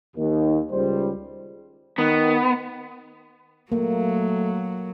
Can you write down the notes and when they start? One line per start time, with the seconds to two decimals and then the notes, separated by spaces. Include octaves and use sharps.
0.16 D#2
0.72 C#2 G3 C5
1.98 D#3 B3
3.72 F#3 A3 A#3